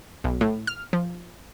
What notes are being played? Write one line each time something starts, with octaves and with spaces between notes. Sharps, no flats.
B1
A2
F6
F3